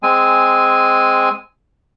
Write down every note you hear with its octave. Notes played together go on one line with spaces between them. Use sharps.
G#3 C4 G#5